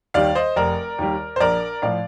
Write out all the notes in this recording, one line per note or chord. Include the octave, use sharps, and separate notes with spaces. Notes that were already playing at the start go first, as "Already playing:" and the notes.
D#2 D#3 G3 D5 F5
C5 D#5
F1 A#4 D5
D#2 D#3 G3
C5
A#1 A#4 D5
A2 F3 D5 F5